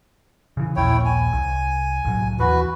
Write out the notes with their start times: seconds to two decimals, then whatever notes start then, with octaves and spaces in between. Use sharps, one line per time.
0.57 C#3 E3
0.76 A#1 D#2 A#2 E4 C#5 G5
1.05 G#5
1.32 C2
2.05 C2 A2 F#3
2.39 D#2 E3 F#4 B4